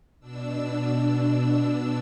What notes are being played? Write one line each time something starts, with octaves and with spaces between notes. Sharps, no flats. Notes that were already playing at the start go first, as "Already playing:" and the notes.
B2 D4 E6